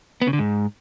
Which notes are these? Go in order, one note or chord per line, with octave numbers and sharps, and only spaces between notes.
B3
C#3
D3
G#2